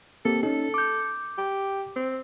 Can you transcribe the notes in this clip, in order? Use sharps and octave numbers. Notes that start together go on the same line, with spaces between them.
A#3 C4 G4 A4
C#4 D#4 A4
D6 G6
G4
C4